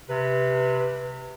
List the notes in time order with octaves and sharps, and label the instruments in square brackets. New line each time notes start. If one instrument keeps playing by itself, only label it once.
[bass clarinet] C3 [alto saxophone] B4